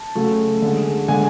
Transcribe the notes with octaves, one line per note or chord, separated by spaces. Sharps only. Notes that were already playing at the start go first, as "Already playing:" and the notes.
Already playing: A5
C#3 F#3 A3
D3 G#3
D3 G#3 G#5